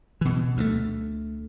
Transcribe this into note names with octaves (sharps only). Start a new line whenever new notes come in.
B2 E3
D2 G3 A3